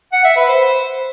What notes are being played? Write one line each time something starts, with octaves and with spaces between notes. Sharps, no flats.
F#5
E5
B4
C5